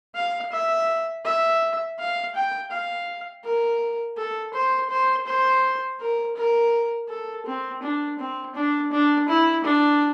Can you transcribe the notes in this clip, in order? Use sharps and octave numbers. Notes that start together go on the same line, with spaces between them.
F5
E5
E5
F5
G5
F5
A#4
A4
C5
C5
C5
A#4
A#4
A4
C4
D4
C4
D4
D4
E4
D4